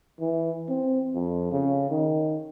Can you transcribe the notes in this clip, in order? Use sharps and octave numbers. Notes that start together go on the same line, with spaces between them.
E3
C4
F2
C#3
D#3